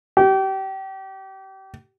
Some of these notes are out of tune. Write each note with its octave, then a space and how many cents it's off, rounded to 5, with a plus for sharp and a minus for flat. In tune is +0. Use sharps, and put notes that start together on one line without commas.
G4 -30